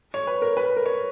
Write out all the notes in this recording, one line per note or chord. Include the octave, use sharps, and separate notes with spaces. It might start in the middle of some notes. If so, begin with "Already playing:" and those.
C#5
B4
A#4
B4
A#4
C#5